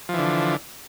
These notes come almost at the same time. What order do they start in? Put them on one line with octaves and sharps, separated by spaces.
F3 E3 D3